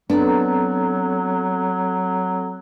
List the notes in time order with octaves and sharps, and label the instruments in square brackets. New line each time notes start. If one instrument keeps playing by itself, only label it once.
[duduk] F#3 [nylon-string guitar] B3 D4 [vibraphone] C4 A4 A#5